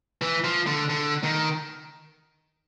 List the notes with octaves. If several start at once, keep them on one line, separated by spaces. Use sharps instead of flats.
E3
F3
D3
D3
D#3